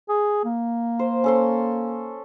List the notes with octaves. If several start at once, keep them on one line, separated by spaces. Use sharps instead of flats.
G#4
A#3
C5
C#4 A4 C6